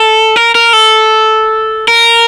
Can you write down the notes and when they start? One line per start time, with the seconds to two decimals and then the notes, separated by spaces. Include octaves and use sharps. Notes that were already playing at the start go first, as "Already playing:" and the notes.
Already playing: A4
0.36 A#4
0.55 A#4
0.73 A4
1.88 A#4